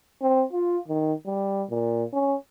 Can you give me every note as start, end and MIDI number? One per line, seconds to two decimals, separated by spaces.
0.22 0.44 60
0.53 0.78 65
0.88 1.13 51
1.26 1.64 55
1.70 2.04 46
2.13 2.36 61